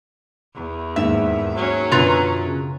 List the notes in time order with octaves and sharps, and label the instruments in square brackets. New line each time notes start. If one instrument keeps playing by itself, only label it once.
[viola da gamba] E2
[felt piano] D#2 G#2 [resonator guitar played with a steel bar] E5
[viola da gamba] F#3 C#4
[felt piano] F#2 B2 D3 [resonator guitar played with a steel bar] F4 B4 A#5
[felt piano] C#3